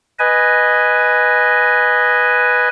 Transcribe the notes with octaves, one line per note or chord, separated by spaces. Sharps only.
B4 D#5 G#5